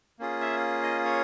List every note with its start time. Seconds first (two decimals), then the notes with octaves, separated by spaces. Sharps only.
0.19 A#3 C#4 F4 G#4
0.41 E5
0.83 D#5
1.05 C#5